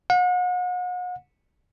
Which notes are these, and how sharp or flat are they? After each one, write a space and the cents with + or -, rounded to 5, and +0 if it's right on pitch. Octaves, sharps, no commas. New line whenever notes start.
F#5 -40